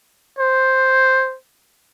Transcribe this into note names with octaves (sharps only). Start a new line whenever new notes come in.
C5